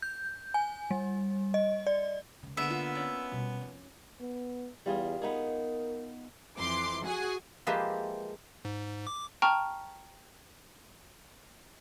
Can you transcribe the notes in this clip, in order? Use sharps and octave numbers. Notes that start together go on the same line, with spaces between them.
G6
G#5
G3
D#5
D5
C#2 C#3
D3 G#3 A#3 B3 A#4 E5
F4
C#4 D5
B2 G3
F2
B3
E2 G3 F4 G#4
B3 D#4 G#4 A#4
F2 E3 C6 D6
F#4 G#4 F#5 G#5
F3 G#3 A#3 G4 B4 E5
G#2
D6
G5 A5 A#5 C#6 F6